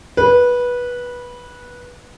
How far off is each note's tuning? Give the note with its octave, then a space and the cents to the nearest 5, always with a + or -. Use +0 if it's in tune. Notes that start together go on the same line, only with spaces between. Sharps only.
B4 -15